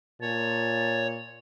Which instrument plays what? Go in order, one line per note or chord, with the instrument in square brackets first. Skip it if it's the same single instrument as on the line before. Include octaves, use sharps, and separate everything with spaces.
[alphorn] A#2 [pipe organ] C#5 [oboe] A5